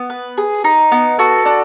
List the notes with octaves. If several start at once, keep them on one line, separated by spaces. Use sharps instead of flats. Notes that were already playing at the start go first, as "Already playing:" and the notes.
Already playing: B3
B4
G#4
D#4
B3
F#4 A4
D4